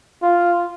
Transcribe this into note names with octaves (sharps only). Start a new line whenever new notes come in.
F4